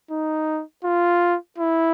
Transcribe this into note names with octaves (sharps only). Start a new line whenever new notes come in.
D#4
F4
E4